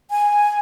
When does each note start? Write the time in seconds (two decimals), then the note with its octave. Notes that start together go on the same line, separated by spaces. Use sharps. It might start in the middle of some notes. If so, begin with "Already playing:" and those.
0.10 G#5